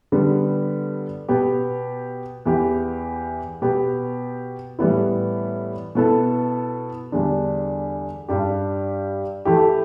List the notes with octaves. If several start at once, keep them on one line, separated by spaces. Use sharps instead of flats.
D3 G3 B3
B2 B3 G4
E2 E3 B3 G4
B2 B3 G4
A2 E3 G3 B3 E4
B2 B3 E4 A4
E2 D3 G3 D4
G2 G3 D4 G4
E3 A3 E4 G4